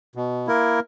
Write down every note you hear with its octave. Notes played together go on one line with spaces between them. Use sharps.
B2
A#3 E4 A#4